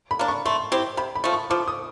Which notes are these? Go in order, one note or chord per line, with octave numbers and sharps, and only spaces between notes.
B5
A#3 D4
C#6
A3 C6
C4 E4 G4
C3 B5
B5
F3 A3
C#6
F3 D6
D#6